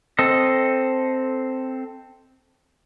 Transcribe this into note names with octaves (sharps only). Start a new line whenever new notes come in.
C4 A4 D#5